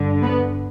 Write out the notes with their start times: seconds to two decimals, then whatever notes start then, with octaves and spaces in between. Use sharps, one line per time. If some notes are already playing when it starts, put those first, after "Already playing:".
Already playing: G2 D3
0.22 B3 B4